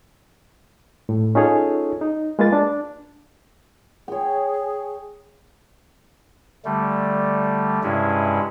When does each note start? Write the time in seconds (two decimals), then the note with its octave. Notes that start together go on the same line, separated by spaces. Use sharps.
1.09 A2
1.35 C#4 D#4 F4 G#4 A4 C#5
2.01 D#4
2.39 G#3 A#3 F4 B4 A6
2.53 D4
4.08 G#4 C#5 G5
6.65 D3 G3 A3
7.83 G2 C3 G#3 C#4 E4